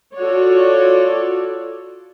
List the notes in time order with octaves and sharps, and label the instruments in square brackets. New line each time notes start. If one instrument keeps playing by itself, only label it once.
[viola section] F4 F#4 A4 C#5 D5